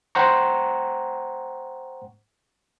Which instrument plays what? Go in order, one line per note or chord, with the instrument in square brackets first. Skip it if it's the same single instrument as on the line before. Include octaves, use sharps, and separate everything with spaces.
[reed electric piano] C5 F#5 G5 A#5 C#6